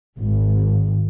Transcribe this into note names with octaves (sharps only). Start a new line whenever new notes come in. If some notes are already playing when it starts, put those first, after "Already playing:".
G#1